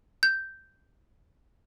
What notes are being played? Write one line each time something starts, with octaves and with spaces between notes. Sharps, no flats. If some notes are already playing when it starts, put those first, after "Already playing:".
G6